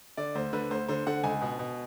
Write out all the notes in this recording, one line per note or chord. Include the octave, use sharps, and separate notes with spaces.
D3 D5
D2 C5
D3 B4
D2 C5
D3 C5
D3 F#5
C#2 G#5
B2
B2